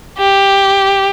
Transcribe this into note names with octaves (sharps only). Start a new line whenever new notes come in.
G4